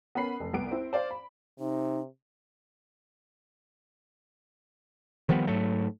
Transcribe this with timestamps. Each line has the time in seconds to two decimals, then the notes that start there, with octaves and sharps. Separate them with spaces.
0.15 B3 C#4 A#4 B5 C7
0.40 F1
0.53 C2 B3 D7
0.71 C4 E4
0.93 C5 D5 F5
1.11 B5
1.59 C3 D#4
5.29 D#3 F3 G3 B3
5.47 G#2 F#3 A3